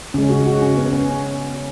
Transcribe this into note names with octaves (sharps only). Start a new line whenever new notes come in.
C#3 G#3 C#4
F#4
F#4
C#4
B3
C#4